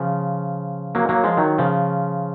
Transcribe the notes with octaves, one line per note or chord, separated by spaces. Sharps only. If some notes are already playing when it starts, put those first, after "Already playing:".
Already playing: C#3 F3
F#3 A#3
F#3 A#3
F3 G#3
D#3 F#3
C#3 F3